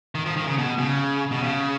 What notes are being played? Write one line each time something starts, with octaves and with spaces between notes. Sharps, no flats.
D#3
F3
D#3
C#3
B2
C#3
B2
C#3